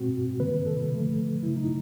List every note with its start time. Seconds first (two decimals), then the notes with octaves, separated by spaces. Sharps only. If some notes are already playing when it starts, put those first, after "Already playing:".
Already playing: B2 G#3 C4 F#4
0.40 C3 D#3 G3 A#3 B4
0.66 A4
0.92 D3 F3 A3
1.43 C#3 F#3 A3 E4
1.56 D#4